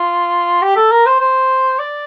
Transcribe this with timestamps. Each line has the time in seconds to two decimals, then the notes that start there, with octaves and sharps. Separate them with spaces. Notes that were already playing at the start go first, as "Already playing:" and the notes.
Already playing: F4
0.62 G4
0.76 A4
0.91 A#4
1.06 C5
1.20 C5
1.79 D5